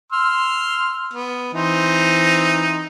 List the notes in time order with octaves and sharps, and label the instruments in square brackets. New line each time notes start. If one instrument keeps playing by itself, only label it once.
[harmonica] C6 E6 F6
B3
E3 C4 D#4